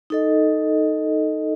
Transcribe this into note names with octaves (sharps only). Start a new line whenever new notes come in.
D#4 A4 D#5